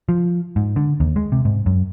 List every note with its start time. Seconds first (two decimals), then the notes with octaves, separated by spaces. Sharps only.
0.09 F3
0.56 G#2
0.76 D3
1.00 D#2
1.16 G#3
1.32 C3
1.45 G#2
1.66 F#2